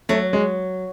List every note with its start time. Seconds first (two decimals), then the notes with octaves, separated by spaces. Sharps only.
0.09 F#3 A3
0.33 G#3